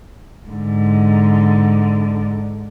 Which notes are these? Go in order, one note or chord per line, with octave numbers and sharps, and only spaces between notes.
G#2 D3